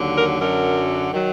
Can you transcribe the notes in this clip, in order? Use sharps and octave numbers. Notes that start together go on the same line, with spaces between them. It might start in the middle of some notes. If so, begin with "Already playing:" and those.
Already playing: D#2 D3 F#3
A#4
F#2 D3 F#3 A#4
D#3 F#3